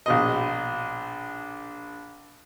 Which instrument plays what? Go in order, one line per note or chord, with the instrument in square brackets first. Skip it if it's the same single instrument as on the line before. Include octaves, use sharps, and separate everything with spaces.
[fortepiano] A#1 B2 D#5